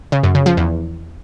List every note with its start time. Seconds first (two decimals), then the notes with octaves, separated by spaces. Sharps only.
0.12 C#3
0.23 F#2
0.35 C#3
0.46 F3
0.57 E2